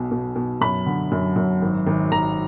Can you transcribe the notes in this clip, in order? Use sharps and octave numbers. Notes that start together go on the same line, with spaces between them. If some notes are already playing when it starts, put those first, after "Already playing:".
Already playing: B1 B2
B2
B2
F#2 B5
D3
F#2
F#2
G#1
G#1
G#1 A#5